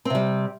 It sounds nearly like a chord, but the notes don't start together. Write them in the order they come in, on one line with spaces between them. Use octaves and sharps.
C4 C3 G3